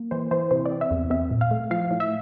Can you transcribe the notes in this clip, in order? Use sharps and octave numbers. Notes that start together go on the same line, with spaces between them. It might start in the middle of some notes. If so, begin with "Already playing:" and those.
Already playing: A#3
E3 C5
E3 C5
C3 C5
D5
C4
E5
E2
C4 E5
A#2
F5
A3
F3 F5
A2
E5